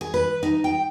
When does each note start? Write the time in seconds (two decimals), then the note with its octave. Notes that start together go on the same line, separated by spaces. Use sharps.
0.01 G#4
0.14 B4
0.43 D#4
0.64 G5